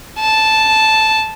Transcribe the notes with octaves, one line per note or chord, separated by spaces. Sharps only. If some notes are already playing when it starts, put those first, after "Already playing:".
A5